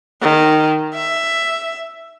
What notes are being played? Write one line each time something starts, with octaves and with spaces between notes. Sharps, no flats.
D#3
E5